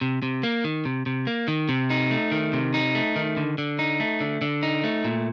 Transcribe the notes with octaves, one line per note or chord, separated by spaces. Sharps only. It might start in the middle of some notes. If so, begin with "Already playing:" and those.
C3
C3
A#3
D#3
C3
C3
A#3
D#3
C3
D#4
A3
D#3
C3
D#4
A3
D#3
D3
D3
D#4
A3
D3
D3
D#4
A3
A#2